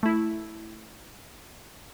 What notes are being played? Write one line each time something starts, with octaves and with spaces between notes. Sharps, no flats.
A3 E4